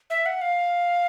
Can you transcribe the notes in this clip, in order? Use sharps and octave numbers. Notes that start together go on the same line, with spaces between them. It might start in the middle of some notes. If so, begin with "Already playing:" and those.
E5
F#5
F5